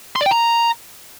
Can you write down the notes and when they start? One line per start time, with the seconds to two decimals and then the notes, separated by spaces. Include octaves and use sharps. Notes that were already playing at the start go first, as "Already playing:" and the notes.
0.16 C6
0.21 D5
0.26 G5
0.31 A#5